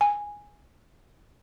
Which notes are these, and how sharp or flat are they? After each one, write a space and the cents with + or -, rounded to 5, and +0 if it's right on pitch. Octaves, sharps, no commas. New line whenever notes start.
G#5 -10